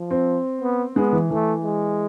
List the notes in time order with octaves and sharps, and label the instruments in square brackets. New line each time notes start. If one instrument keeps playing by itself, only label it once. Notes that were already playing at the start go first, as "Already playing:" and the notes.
Already playing: [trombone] F3
[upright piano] C4
[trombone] B3
[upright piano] G#3 [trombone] B3
[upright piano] E3
[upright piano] E3 [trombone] A3
[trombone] G#3